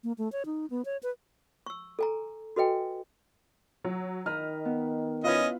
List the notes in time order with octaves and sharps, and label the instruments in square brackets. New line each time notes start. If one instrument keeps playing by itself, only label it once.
[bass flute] A#3
A3
C#5
D#4
B3
C#5
B4
[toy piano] C#6 E6
A4 G#5 A#5
F#4 A4 B4 D#5 G5 G#5
[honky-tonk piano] F#3
[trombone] D#3 [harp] D#5 A#5 B5 [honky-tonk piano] F6
[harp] B3
[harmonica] C#4 D#5 [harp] E4 [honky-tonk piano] F4 B4